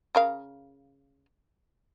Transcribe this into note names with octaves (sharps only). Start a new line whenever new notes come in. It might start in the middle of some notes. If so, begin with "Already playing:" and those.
C#3 A#4 F5